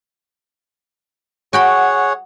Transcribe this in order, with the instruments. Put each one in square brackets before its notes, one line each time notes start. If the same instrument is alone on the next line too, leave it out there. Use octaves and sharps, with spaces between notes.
[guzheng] F#4 G5 B5 [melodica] G#4 C#5 F#5